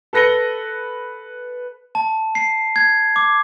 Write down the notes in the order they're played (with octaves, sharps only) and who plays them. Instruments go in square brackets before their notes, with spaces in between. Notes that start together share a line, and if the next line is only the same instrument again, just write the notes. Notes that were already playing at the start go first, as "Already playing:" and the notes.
[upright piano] A4 B4 A#6 C#7 G7
[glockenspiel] A5
C7
G#6
D6